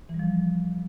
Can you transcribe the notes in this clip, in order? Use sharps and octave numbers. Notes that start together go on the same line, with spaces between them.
E3
G3
F3